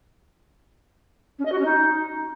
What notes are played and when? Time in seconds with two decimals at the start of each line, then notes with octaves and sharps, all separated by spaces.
1.39 C#4
1.45 D#5
1.52 F#4
1.59 C#4
1.65 D#4